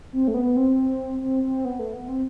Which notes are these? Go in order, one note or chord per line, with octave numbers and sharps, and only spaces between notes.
C4
A3
B3
C4
C4
C4
B3
A3
B3
C4